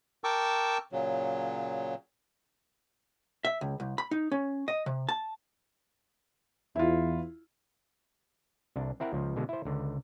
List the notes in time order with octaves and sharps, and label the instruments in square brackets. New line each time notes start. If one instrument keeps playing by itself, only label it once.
[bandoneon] A#4 G5 A5 C#6 D6 E6
A#2 C#3 F#3
[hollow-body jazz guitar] E5
C#2
C2
B5
D#4
C#4
D#5
C3
A5
[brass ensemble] E2 [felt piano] E4 F4
[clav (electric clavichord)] C2 D4
C4 E4 A#4 F#5
C#2 F3
B2 D3 G#3
E4 C5
C#2 D3